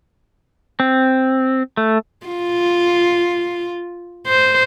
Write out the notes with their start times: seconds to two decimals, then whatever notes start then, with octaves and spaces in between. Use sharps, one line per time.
0.80 C4
1.77 A3
2.27 F4
4.27 C5